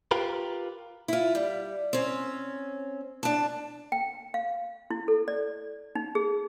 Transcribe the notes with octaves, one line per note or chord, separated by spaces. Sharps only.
F4 G4 A#4 B4
E4 F4
G3
C4 C#4
D4 A5
G5
F5
E4
A4
D5
D#4
G#4